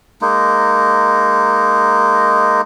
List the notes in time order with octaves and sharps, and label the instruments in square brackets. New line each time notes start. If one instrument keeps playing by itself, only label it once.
[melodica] G#3 A#3 D#4